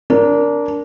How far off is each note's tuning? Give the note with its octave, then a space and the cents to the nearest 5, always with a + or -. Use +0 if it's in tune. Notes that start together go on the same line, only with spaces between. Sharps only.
D4 -20 A#4 +0